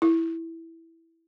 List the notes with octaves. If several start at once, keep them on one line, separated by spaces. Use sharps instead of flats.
E4